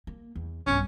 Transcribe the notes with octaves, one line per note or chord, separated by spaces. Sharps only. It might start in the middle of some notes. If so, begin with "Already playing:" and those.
A#3
E2
B1 G2 C#4